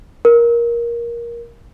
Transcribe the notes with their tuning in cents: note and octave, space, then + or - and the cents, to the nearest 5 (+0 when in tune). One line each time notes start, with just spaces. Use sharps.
A#4 +15